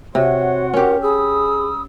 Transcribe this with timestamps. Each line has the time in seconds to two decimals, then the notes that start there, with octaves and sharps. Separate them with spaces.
0.15 C3 F#4 C#5 F#5 C6
0.73 C#4 G4 A#4
1.02 G#4 B5 D#6 E6